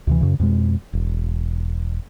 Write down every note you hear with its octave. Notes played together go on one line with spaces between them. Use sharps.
D2 C3 E3
F#2 C#3
F2 B2 G#3
E1